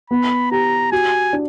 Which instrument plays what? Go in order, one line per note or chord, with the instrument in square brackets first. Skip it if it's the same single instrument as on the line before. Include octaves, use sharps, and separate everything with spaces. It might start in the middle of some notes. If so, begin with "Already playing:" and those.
[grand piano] B3 [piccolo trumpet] B5
[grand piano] G4 [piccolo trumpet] A#5
[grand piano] F#4 [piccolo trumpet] G#5
[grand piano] D4